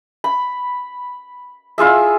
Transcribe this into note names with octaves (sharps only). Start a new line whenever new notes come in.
B5
E4 F4 G#4 E5